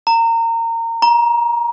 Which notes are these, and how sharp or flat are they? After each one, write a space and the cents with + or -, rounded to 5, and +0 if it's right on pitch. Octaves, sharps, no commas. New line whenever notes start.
A#5 -25
A#5 +25